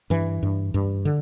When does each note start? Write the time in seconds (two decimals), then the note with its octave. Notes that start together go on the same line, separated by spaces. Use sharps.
0.10 G2 E3
0.43 G2
0.74 G2
1.05 D3